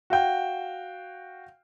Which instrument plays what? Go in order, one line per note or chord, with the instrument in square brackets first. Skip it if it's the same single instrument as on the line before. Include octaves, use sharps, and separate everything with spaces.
[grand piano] F#4 F5 G5